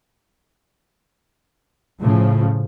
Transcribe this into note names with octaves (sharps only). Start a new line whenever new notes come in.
A2 C#3 F3